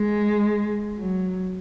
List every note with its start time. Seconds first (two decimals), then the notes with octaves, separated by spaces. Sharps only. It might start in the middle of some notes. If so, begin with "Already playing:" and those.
Already playing: G#3
0.98 F#3